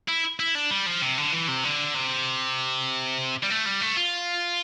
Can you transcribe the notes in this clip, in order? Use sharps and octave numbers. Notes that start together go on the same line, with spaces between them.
E4
E4
D4
G3
F3
C3
D3
E3
C3
D3
C3
G3
A3
G3
A3
F4